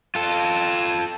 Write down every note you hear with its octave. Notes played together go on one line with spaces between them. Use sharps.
F4 A4